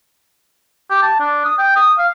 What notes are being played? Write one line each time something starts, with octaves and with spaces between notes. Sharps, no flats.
G4
A5
D4
D#6
G5
D#6
F5